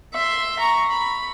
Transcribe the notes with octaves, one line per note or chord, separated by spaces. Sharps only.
E5 C6
A#5 C#6
B5